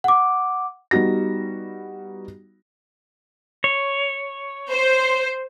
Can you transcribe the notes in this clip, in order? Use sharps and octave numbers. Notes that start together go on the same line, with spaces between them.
F#5 D6
G3 B3 D#4 F#4 A#6
C#5
C5